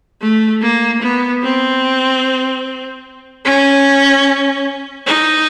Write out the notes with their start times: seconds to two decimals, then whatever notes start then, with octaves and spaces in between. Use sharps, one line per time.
0.21 A3
0.62 A#3
1.02 B3
1.43 C4
3.45 C#4
5.06 D#4